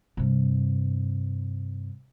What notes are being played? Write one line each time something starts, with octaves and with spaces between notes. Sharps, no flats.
G2 C3